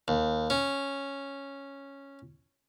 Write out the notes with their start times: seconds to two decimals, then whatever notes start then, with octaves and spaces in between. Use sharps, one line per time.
0.08 D#2
0.50 C#4